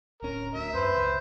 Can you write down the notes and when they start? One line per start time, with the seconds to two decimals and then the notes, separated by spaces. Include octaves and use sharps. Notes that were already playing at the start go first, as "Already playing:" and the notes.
0.23 D1 C#4 A#4
0.55 D2 E5
0.75 F#2 B4 C5
0.97 C#2